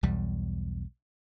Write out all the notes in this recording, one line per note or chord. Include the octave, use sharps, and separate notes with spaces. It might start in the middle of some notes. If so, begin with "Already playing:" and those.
B1 E2 G3